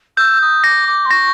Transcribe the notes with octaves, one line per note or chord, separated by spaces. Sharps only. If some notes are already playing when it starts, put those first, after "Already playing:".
E6 G6
D#6
D6 A#6
D6
C6
C#6 A#6